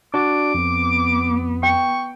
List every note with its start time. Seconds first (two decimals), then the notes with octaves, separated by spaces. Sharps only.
0.14 D4 F#4 D5 D6
0.54 F2 B3
1.63 G5 C#6